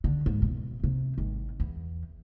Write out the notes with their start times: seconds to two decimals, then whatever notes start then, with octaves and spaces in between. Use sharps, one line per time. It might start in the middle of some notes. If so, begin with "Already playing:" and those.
0.04 D3
0.26 G#2
0.42 B2
0.84 C3
1.18 G#1
1.60 E2